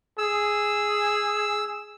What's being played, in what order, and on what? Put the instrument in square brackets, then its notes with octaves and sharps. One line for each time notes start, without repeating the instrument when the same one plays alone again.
[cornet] G#4 [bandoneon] E6